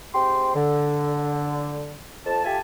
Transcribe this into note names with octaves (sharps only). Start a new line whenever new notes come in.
G#2 C4 G4 G5 C6
D3
F2 A5
F4 G4 A4 E5 G#5 A5